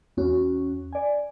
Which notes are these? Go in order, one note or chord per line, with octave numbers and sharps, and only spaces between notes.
E2 C#4 F#4
D5 G#5